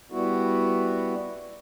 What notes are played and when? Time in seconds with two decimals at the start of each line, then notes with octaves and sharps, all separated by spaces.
0.12 G3 B3 E4 F#4